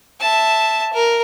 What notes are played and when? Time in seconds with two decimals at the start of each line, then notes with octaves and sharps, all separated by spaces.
0.21 E5 A5
0.93 A#4